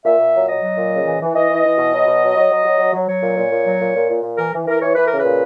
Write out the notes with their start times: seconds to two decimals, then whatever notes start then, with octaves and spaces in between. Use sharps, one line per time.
0.05 A#2 E5
0.19 A#2
0.34 F#3
0.48 F#3 D#5
0.63 F#3
0.77 A#2
0.92 C#3
1.06 E3
1.21 E3
1.35 E3 D#5
1.49 E3
1.64 E3
1.78 B2
1.92 F#3
2.07 B2
2.22 F#3
2.36 F#3
2.51 F#3
2.64 F#3
2.79 F#3
2.94 F#3
3.08 F#3 C#5
3.23 A#2
3.37 A#2
3.52 A#2
3.67 F#3
3.81 A#2
3.95 A#2
4.09 A#2
4.23 A#2
4.38 E3 A#4
4.53 E3
4.67 E3 A#4
4.81 E3 C#5
4.94 E3 B4
5.07 C#3 A#4
5.18 B4
5.25 A#2